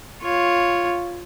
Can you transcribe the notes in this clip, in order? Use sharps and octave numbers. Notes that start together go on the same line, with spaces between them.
F4 C#5